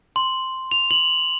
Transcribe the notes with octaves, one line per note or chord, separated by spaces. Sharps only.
C6
F7
F#7